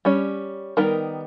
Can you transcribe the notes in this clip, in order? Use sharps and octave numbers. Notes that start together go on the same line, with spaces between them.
G3 C#4
D#3 G3 B3 D#4 A#4